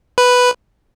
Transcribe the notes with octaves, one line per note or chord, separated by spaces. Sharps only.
B4